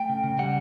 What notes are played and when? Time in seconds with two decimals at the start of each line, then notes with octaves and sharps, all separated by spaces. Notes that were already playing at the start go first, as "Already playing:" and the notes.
Already playing: A3 G5
0.09 C#3
0.24 C#3
0.39 G3 F#5